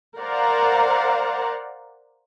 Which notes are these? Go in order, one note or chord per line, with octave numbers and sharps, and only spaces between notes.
A#4 C5 D5 F5 F#5 A#5